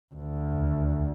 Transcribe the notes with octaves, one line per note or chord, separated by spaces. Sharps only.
D2
D#2